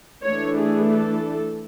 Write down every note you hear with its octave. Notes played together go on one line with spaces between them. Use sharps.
E3 A3 D4 C#5
G#4
A4